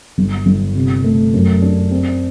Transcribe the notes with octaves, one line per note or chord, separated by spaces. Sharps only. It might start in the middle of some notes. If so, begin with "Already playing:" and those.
G1
G1
C3
A3
F#2
D4
C4